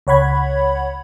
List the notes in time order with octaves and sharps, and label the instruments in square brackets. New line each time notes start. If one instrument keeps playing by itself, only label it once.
[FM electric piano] C#2 C#5 F#5 B5 G#6